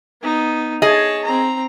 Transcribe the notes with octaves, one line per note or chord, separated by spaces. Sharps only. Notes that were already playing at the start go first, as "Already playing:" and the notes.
B3 D#4
G#4 C#5 D#5 A5
C4 A#5